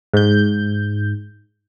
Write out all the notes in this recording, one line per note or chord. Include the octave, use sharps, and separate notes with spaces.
G#2 G6